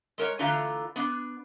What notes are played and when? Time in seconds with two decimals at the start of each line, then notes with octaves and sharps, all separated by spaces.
0.18 G#3 A#4 C#5
0.39 D3 E3 A3 F4 A#5
0.96 B3 D4